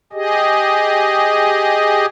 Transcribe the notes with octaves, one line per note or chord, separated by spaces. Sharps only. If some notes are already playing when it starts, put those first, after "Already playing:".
G4 G#4 D#5